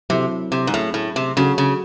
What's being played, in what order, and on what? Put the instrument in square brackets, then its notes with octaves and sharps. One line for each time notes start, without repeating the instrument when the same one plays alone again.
[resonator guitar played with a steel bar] C3 [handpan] F#3 C4 E4 A4
[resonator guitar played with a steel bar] C3
G#2
[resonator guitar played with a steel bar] A2 [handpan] A3 C#4 G#4
[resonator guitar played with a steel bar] A2
C3
[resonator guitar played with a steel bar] C#3 [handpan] F#3 C#4 F#4 A4
[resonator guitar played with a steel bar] C#3